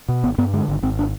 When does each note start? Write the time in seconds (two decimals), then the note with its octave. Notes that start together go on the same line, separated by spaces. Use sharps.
0.08 B2
0.23 G#1 B3
0.38 G2 B3
0.53 D3 G#3
0.68 G#1
0.83 G#1 C4
0.99 D4